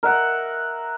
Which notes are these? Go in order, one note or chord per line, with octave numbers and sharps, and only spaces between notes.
A#4 E5 F#5